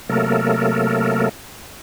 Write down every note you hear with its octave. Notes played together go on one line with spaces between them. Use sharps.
C3 F#3 A3 A#3 A4 A#4